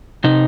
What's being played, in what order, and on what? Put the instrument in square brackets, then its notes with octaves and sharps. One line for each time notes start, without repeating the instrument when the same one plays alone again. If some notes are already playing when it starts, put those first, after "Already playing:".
[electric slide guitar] C3 D#4